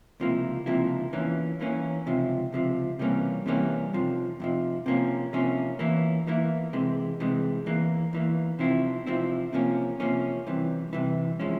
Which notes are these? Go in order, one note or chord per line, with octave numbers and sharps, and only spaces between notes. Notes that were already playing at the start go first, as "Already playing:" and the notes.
C#2 C3 F3 A#3 E4
C#2 C3 F3 A#3 E4
E2 E3 A#3 C#4
E2 E3 A#3 C#4
C#2 C3 F3
C#2 C3 F3
C3 E3 G3 A#3 C#4
C3 E3 G3 A#3 C#4
F2 C3 F3
F2 C3 F3
C3 F3 A#3 C#4
C3 F3 A#3 C#4
E2 E3 A#3 E4
E2 E3 A#3 E4
C3 E3 G#3
C3 E3 G#3
E2 E3 A#3
E2 E3 A#3
C3 F3 C4 E4
C3 F3 C4 E4
C3 F3 A#3 C#4
C3 F3 A#3 C#4
C2 C3 E3
C2 C3 E3
F3 G#3 C#4 E4